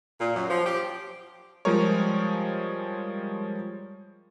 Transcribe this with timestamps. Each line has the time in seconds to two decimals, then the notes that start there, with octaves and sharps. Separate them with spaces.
0.21 A#2
0.35 F#2
0.49 F3
0.66 G4
1.65 F3 G3 G#3 G#4 A#4 C#5